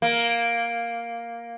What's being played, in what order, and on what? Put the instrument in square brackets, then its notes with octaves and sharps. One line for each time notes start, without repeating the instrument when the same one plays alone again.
[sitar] A#3